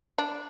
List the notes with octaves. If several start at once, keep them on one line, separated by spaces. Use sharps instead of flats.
D4